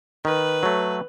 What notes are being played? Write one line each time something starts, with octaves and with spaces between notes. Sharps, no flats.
D#3 B4
F#3 A3